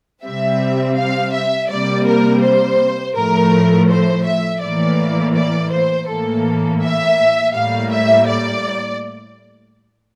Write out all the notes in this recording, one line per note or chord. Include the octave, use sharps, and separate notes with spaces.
C3 G3 C4 E5
F5
E5
C3 G3 A#3 D5
A#4
C5
A2 F3 A3 A#4
C5
E5
A2 E3 A#3 D5
D5
C5
A2 E3 A#3 A4
E5
A2 G3 A#3 F5
E5
D5